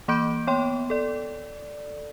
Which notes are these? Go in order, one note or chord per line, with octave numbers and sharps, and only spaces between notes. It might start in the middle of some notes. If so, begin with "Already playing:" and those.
E3 A#3 B5 D6 G6 D7
B3 C#5 G5 C6
A4 D5